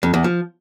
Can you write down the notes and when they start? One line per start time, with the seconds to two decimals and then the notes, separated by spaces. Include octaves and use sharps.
0.03 F2
0.14 E2
0.24 F3